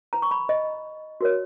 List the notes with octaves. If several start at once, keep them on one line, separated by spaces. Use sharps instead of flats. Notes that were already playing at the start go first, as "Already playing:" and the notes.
E4 B4 A#5
C#6
B5
D#5
F#4 A#4 C#5